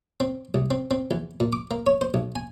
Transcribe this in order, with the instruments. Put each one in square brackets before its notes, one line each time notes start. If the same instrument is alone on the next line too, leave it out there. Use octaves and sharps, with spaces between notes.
[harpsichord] C4
C2
C4
C4
E2
A#2
D6
A#3
C#5
C5
B1
G#5